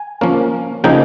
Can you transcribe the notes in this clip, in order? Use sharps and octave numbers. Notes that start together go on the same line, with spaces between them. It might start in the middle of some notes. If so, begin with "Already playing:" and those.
Already playing: G#5
F3 A#3 C#4
C#3 F3 A#3 D#4 G5